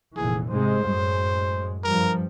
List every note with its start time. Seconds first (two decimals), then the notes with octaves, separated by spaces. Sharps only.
0.17 F1 A#2 E3 G#4
0.50 G#2 C3 G#3 C5
0.85 F#2 A2 G#3
1.84 G2 F3 A#4